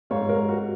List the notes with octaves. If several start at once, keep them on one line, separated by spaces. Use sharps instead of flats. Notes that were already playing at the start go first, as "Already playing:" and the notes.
G#2 C#5 F5
A#4 C#5
G#2
F#4 A#4